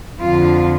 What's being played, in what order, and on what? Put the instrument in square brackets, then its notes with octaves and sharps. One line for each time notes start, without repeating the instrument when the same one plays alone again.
[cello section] F2 D3 F4